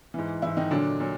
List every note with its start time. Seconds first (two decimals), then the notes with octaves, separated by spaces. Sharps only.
0.14 G#2 E3
0.42 G#2 E3 E4
0.57 D#3 D#4
0.71 A#2 D3 F#3 D4
1.00 A#2 F#3